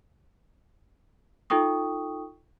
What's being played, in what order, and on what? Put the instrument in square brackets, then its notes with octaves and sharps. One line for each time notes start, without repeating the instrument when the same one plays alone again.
[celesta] D#4 F4 A4 G5 C#6 D#6